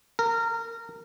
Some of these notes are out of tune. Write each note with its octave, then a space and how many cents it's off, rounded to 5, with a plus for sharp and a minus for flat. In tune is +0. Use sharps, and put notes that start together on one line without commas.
A#4 -20